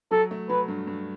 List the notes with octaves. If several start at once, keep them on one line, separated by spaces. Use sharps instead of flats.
F#3 A4
A3
F#3 B4
G2
G2